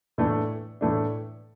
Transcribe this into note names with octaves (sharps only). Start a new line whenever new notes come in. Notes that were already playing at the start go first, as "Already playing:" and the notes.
A2 E3 A3 D4
A2 E3 A3 D4